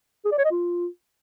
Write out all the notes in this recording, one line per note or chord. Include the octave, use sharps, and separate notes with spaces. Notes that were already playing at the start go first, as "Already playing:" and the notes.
G#4
D5
C#5
D#5
F4